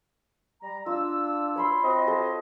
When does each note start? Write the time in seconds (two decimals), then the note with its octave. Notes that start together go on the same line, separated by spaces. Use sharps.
0.62 G3 A#5
0.86 D4 F4 E6
1.56 C#5 B5 C6
1.84 C4 F#4 D#5
2.08 A4 C#5